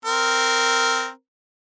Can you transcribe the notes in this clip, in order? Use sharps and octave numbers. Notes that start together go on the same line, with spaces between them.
C4 A#4